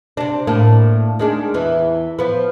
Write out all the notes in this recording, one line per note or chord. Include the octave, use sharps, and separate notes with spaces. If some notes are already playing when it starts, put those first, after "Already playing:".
C3 D4
A2 A#3 D4
D#3 G#3 D4
E2 E3
F3 B3